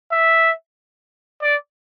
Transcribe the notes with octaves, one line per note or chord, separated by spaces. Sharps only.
E5
D5